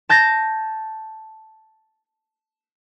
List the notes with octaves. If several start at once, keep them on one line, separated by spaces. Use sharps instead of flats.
A5 G6 A6 A#6